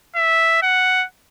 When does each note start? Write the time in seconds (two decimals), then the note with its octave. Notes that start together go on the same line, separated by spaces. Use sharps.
0.15 E5
0.63 F#5